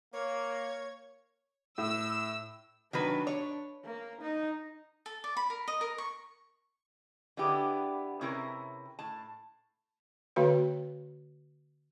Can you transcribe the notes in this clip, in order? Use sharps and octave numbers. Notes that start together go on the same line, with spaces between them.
A#3 C#5
A2 E6
D#3 F#3 D4 B4
C#5
A#3
D#4
A4
D5
B5
A#4
D#5
A#4
C#6
D3 B3 E4 G4 G#4
C3 C#4 E4 G#4 A#4
A2 A5
D3 A#3 F#4 B4 C#5 G5